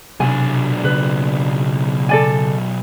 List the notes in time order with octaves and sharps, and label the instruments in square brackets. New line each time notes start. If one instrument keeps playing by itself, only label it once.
[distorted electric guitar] B1 D4 [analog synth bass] C3 [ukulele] G#5
[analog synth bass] C#3 [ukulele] B4
[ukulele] A4 D5 G#5